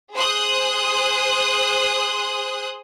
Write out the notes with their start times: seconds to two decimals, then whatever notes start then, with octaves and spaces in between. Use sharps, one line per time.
0.14 G#4 C5 C6 D#6 F#6